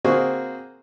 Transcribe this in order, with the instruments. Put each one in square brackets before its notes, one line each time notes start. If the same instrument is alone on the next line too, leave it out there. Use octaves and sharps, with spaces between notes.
[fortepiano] A#3 C4 F#4 G#4